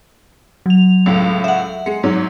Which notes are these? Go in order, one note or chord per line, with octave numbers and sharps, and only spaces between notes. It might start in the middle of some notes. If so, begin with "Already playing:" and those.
F#3 F7
C#2 A2
E5 F#5
G#3 C#7
G#2 F#3